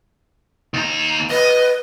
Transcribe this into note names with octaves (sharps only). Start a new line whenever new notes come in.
D#2 A#5
B4 D#5